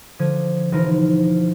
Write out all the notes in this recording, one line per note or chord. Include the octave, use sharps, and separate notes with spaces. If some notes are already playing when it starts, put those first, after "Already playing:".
D3 F3 D#6 G#6
E1 E3 F3 D#4 A#4